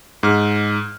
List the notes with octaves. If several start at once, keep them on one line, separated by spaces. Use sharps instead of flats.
G#2 F6